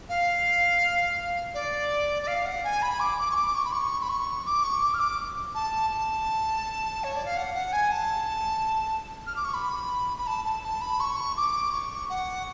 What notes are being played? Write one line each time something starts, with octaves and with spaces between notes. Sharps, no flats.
F5
D5
D5
F5
F#5
G#5
B5
D6
D6
C#6
D6
C#6
B5
C#6
B5
C#6
D6
C#6
D6
F6
D6
A5
A5
C#5
D5
F5
F#5
F#5
G#5
A5
F6
D6
C#6
B5
B5
A5
A5
A5
B5
C#6
D6
C#6
F#5